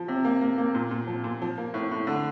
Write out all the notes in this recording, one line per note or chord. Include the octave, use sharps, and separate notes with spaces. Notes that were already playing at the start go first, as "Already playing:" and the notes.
Already playing: F3
C3
A#3
A#3
A#3
A#2
A#2
F3
A#2
F3
A#3
A2
A2
D3